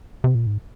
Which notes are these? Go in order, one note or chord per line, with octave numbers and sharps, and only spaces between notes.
C3
A#2
G#2